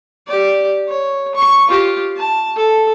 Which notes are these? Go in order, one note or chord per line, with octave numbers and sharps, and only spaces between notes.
G4 D5
C#5
C#6
F4 G4
A5
A4